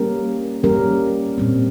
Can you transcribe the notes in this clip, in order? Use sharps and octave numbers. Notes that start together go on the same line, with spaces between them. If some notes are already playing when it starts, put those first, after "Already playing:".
Already playing: G3 A#3 C#4 G4 A#4
G3 A#3 C#4 G4 A#4
A#2 G3 C4